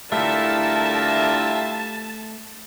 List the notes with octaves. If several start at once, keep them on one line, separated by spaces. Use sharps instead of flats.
D3 G3 A3 E4 F4 A#4 E5 A5